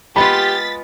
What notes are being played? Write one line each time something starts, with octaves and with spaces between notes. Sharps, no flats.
G#3 B3 F4 G4 B5 A6 B6